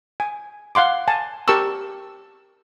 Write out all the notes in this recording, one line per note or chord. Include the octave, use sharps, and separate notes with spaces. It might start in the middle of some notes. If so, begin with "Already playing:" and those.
G#5
F5 F#5 C6 D6
G#5 A5
G4 A#4 A5 C#6 E6